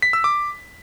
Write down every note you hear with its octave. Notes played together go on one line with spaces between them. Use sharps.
B6
E6
D6